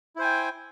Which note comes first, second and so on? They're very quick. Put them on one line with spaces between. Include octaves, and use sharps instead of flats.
E4 C5 G#5 G5